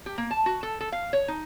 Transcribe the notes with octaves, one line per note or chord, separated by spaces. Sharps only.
G4
A#3
A5
F#4
A4
A4
F5
C#5
D#4